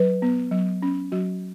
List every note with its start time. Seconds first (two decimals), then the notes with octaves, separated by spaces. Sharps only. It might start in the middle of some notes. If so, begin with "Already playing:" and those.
Already playing: F#3 B4
0.22 B3
0.51 F#3
0.82 C#4
1.12 F#3 F#4